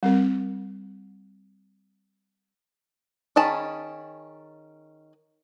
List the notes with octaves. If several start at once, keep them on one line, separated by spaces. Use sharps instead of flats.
G3 C4 A#4
D#3 C#4 G#4 A5 B5